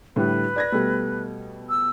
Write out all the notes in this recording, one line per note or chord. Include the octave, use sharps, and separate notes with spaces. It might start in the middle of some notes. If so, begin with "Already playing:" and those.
A2 D3 G3 B4
D5 G#6 A#6
B2 G3 A3
E6